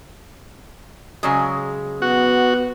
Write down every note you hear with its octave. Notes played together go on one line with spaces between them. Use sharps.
C#3 F#3 G#3
B3 F#4